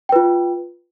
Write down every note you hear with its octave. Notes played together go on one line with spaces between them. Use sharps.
F4 B4 G5